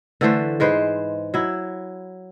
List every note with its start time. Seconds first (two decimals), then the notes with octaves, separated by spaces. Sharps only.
0.21 D3 E3 A3 C5
0.60 G#2 G#3 B4 C5
1.34 F#3 E4